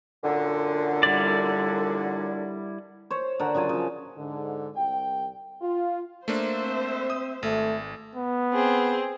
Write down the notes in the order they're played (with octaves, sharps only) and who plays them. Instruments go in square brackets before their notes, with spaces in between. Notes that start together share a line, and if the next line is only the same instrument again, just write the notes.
[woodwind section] F#2 A#2 D3
[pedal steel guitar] G3 E4 D5
[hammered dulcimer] C5 C#5
D3 A#4 F#5
C#3 F#3 F4 G#5
C#3 F3
[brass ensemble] G#2 D3
C2 G5
F4
[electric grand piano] A3 A#3 D4 [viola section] C5 E5
[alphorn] C4
[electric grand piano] D#6
[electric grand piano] G#1 [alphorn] A3
[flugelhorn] B3
[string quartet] C4 G#4